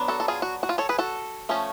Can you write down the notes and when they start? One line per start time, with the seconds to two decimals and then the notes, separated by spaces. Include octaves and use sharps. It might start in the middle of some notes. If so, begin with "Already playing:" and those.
Already playing: F#3 B3 D4
0.08 F#4 A4
0.20 A4
0.28 F4 G#4
0.42 F#4
0.63 F#4
0.69 F4
0.78 A4 C#5
0.89 G#4 B4
0.98 F#4 A4
1.49 F3 A3 C#4